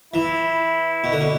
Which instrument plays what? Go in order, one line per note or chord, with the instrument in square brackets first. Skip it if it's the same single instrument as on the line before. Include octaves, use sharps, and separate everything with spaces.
[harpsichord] E3 [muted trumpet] E4
[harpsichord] B2
D3
B2